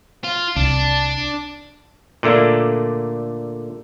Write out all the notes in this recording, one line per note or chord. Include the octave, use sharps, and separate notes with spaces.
F4
C2 D4
A#2 D3 A3 A#3 D4